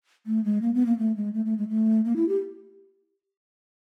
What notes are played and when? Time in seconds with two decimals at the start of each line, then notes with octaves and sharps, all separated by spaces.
0.26 A3
0.44 G#3
0.62 A#3
0.74 B3
0.86 A#3
0.98 A3
1.16 G#3
1.34 A3
1.46 A3
1.58 G#3
1.69 A3
2.05 A#3
2.16 E4
2.29 G4